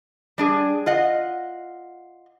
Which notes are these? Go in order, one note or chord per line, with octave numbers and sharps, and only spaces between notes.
G3 D4 G#4
F4 D#5 F#5